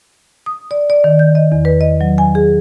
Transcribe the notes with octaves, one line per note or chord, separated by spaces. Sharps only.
D#6
D5
D5
D#3
G6
D#5
E2
B4
D#5
F#3
G#5
G#4